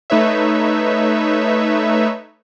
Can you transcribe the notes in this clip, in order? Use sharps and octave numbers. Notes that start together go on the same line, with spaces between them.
A3 D#4 B4 C#5 E5